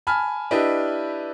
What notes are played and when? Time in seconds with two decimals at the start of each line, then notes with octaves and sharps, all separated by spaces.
0.07 G#5 A5 B5 F6
0.51 D4 E4 G4 B4 D#5